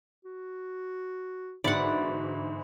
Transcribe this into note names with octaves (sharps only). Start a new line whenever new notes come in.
F#4
G1 G#2 E3 F#4 D5 F#5 B5